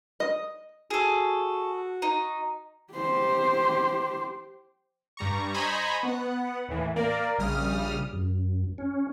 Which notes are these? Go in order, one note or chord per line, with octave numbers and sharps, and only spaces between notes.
D#5
F#4 G#4 A4
D#4
G4 C5
G2 G3 A#5 C#6
C5 D#5 G#5 A#5 B5 C#6
B3 F#5
D#2 A2 E3
A#3 A#4 D5
A#1 C#3 G3 D#6 F6
F#2
C#4